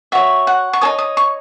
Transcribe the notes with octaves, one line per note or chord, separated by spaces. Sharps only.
F#4 C#5 E5
F#5
C#6
D#4 A4 C#5 D#6
D#6
C#6